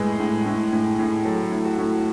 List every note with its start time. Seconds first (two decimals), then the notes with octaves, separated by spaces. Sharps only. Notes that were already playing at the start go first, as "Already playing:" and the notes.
Already playing: A2 G#3 B4
0.19 A2
0.46 A2
0.72 A2
0.99 A2
1.25 F#3 A4
1.52 A2
1.65 F#4
1.78 A2